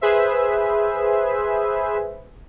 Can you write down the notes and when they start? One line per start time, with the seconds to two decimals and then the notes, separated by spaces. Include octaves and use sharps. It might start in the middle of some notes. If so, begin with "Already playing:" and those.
0.01 G#4 B4 C5 E5